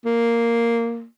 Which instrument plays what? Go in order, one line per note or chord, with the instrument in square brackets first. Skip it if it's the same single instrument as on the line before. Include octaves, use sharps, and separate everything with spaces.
[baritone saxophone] A#3